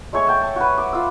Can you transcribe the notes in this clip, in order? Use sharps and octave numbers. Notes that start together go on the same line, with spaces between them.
G#3 A3 C#5 C#6
G5 A5
A5
F#4 B4
D6
F4 E6